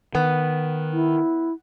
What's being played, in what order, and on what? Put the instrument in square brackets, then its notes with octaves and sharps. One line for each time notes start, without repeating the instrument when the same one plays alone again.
[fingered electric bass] D#3 [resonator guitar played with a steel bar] B3
[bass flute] E4